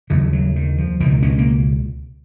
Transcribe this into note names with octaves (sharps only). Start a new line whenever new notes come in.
D#2 C#3 F#3
F#3
D#3
F3
C#2 B2 D#3
C#4
A#3